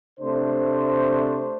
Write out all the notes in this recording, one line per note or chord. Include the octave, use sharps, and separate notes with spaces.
C3 A3 D4 C5